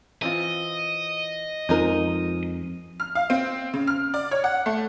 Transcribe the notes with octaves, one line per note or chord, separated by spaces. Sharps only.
E3 C4 F4 D#5
F2 F3 G#3 D#4 A#4
F6
F5
C4
C#3
F6
D5
C#5
F#5
A3